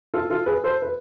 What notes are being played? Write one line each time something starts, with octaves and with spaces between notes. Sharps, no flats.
F4 A4
F4 A4
G#4 B4
A4 C5
B4